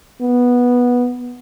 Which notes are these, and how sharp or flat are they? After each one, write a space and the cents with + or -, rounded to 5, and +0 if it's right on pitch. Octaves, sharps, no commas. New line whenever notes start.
B3 -10